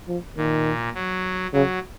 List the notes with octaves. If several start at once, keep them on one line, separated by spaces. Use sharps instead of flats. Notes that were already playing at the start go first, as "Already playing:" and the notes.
F3
A#2 D#3
F#3
C#3 F#3